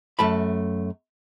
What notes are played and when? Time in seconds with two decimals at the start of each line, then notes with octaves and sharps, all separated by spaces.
0.19 F#2 A3 A5 B5